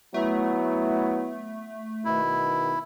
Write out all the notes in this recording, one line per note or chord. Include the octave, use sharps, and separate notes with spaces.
F#3 A3 B3 E4
B2 D#3 E4